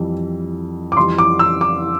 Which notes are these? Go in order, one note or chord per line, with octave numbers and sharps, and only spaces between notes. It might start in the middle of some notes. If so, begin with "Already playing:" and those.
Already playing: F2 E3 G3
D6
F2 E3 G3 C6
D6
E6
D6